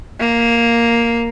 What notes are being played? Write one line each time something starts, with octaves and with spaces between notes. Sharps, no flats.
A#3